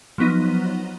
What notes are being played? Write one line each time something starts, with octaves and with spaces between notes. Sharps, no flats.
F3 F#3 B3 D#4